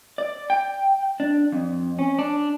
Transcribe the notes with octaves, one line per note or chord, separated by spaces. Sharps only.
D5
G5
D4
F2
C#4
D4